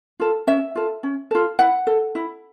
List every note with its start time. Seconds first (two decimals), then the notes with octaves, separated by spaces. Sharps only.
0.20 F4 A4
0.47 C#4 E5
0.75 F4 A4
1.03 C#4
1.31 F4 A4
1.59 E4 F#5
1.87 A4
2.15 E4